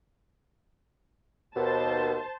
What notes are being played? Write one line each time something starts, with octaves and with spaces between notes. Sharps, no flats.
D#2 B2 C5 A5